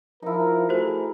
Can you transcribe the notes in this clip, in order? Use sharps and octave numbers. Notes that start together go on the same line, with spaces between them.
F3 D#4 E4 A#4
A3 F#4 G#4 A#4 C5